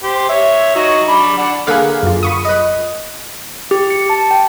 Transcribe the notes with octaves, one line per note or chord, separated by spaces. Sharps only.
G4 C5
C#5 E5
D#4 F#4
D4 D5 B5
D4 F#5
D3 A#3 G#4 B4 F5
F#2 F4
B5 C#6 D#6
B4 D#5
G4
C#7
A5
G5